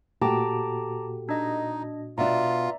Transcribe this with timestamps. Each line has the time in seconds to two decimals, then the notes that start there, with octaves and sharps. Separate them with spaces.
0.22 A#2 A3 F#4 G4 A5 A#5 D6
1.29 D4 D#4 D#5
2.18 B2 D4 F4 D5 E5 A#5